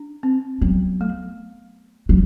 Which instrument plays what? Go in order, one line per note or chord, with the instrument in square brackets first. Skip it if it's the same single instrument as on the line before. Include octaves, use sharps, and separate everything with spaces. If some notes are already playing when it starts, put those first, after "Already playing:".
Already playing: [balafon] D4
C4
[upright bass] F#3 [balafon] B3
[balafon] A3
[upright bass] F#3